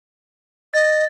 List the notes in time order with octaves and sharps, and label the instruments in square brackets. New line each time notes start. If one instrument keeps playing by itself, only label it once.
[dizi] D#5 [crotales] A6